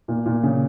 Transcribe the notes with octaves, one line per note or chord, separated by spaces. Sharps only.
A#2
A#2
C#3